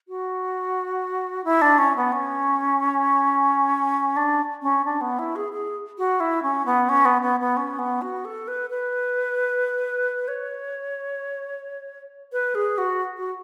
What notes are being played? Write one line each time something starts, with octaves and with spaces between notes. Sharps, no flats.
F#4
E4
D4
C#4
B3
C#4
D4
C#4
D4
B3
E4
G#4
G#4
F#4
E4
C#4
B3
C#4
B3
B3
B3
C#4
B3
F#4
A4
B4
B4
C#5
B4
G#4
F#4
F#4